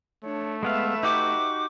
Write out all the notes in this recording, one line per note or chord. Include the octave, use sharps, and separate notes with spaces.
A3 D4 C#5
G#3 B3 B4 E5 F5
D#4 F#4 G4 D6